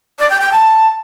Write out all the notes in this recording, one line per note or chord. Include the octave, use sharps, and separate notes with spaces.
D5
G5
G5
A5